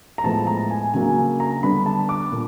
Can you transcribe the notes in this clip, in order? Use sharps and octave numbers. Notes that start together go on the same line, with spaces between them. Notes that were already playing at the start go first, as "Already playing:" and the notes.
A#5
A2 F3 G#3 B3 A5
A#5
G#5
C#3 F#3 A#3 D4 G#5
A#5
D3 G3 B3 D4 B5
A5
D6
A#2